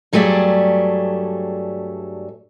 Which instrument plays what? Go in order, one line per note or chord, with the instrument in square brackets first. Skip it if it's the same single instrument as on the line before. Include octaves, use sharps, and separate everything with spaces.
[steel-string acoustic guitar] G2 F#3 A3 G4 G#4 D5